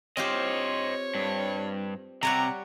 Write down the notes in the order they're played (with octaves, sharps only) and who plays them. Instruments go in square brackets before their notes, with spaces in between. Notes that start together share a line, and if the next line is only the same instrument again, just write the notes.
[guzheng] C4 F4 G4 [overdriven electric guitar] C5 D#5 [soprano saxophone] C#5
[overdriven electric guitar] G2
[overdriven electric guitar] C3 [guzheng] G3 C#5 F#5 [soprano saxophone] A#5